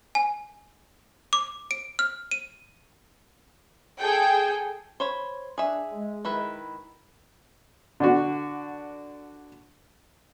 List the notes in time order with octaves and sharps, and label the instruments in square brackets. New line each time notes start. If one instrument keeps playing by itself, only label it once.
[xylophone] G#5
D6
D7
F6
D#7
[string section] G#4 A4 G5
[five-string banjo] C5 C#5 B5
[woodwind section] D4 [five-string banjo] G#4 E5
[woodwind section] G#3
[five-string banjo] D#3 E4 B4
[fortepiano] D3 D4 F#4